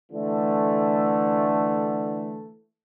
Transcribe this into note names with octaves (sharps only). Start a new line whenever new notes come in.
D3 E3 A3